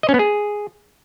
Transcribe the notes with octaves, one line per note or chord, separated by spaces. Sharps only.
D#5
C#4
B3
G#4